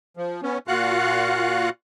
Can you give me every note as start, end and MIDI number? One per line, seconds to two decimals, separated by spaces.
0.17 0.41 53
0.43 0.58 59
0.43 0.58 61
0.68 1.69 46
0.68 1.69 65
0.68 1.69 66
0.68 1.69 77
0.68 1.69 78
0.68 1.69 90